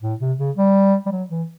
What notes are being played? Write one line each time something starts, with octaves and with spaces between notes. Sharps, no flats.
A2
C3
C#3
G3
G3
F#3
E3